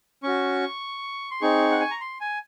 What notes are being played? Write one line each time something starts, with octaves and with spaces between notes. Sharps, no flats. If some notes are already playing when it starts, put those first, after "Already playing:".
C#4 F#4 C#6
C6
C4 D#4 G#4 C#6
F#5
G#5
A#5
C6
G#5